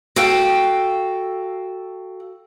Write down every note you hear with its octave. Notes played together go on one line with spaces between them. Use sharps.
F#4 A4 F5 G5